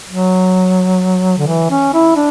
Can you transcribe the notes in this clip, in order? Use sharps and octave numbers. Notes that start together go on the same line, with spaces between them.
F#3
D3
E3
C#4
E4
D4